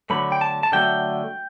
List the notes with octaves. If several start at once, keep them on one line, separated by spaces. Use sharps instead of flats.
D3 F#3 A3 B5
G5
A5
A5
D3 F#3 A3 G5